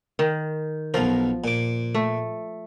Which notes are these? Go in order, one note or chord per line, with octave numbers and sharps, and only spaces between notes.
D#3
B1 F3 A#4
A#2 D6
A3